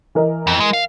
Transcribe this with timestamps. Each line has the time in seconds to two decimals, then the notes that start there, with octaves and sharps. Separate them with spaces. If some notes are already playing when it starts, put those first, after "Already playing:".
0.15 E3 A#4 D#5
0.47 F2
0.60 G#3
0.73 F5